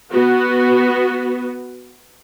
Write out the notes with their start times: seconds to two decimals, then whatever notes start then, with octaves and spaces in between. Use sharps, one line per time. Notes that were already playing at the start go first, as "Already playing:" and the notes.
0.11 B3 F#4